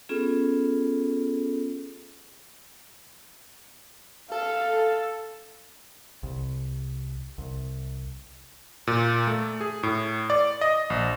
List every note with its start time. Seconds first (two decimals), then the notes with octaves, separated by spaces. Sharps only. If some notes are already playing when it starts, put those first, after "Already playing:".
0.09 B3 C#4 F4 G#4 A4
4.32 A4 F5
6.23 C2
7.38 C2
8.87 A#2
9.27 A3
9.61 G#4
9.83 A2
10.30 D5
10.61 D#5
10.90 A#1